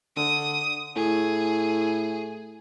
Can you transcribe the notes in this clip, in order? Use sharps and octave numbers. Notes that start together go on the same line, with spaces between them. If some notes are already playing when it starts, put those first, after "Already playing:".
D3 D#6
A2 G#4